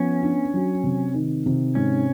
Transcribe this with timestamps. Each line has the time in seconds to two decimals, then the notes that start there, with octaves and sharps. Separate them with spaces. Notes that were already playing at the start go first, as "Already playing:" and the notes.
Already playing: F3 B3 C#4
0.22 D4
0.54 F#3
0.84 C3
1.14 D#3
1.46 C3
1.75 G#2 C#4